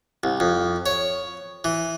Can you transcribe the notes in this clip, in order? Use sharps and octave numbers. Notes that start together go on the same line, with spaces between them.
C2
F2
C#5
E3